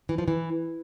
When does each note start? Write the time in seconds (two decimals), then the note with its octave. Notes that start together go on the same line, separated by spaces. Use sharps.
0.09 E3
0.18 F3
0.28 E3